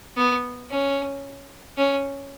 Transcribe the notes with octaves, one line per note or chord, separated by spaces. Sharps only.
B3
C#4
C#4